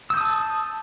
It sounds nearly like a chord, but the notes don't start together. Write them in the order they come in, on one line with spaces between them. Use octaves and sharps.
E6 G6 D#6 A5